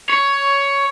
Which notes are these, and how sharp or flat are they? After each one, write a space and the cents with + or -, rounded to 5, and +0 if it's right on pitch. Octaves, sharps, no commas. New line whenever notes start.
C#5 +10